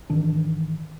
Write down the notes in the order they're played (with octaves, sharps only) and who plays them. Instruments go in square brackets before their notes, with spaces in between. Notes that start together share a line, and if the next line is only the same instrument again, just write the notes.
[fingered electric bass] G#1 D#3 E3 D4